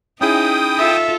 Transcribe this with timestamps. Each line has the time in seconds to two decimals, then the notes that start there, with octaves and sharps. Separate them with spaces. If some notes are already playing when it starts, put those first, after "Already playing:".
0.21 C#4 D#4 E4 G#4 G5 D#6
0.77 F4 A4 E5